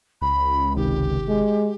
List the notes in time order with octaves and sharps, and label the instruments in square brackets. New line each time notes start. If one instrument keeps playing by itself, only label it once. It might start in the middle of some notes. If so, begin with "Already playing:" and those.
[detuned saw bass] C#2 [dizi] B5
[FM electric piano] G1 C3 D#3 [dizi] G4
[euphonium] G#3